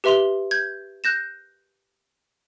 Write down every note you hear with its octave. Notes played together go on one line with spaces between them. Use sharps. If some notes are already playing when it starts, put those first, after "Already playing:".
G4 B4 E5 C6 F7 G7
G6 G#6
F#6 G6 A#6 E7